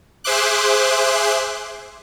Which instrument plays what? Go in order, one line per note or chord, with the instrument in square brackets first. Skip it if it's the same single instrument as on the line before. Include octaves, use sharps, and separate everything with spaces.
[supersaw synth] G#4 C5 E5 C6 D6 F#6